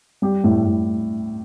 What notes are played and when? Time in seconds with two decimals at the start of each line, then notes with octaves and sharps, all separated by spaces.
0.22 G3 G4
0.44 A2
0.66 A2